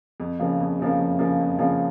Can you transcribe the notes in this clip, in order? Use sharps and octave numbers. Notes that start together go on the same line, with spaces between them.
F2
C#3 F3 A#3
F2
C#3 F3 A#3
F2
C#3 F3 A#3
F2
C#3 F3 A#3